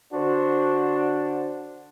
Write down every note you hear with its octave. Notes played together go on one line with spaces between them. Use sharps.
D3 D4 F#4 C5